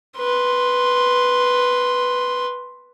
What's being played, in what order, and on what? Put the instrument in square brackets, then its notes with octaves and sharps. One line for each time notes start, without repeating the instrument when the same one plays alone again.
[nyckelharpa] B4 C6